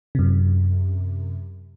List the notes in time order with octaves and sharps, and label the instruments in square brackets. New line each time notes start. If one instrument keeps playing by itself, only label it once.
[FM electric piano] F#2 C3